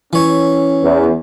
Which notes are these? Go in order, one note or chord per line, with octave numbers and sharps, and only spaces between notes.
E3 C#4 C#5
E2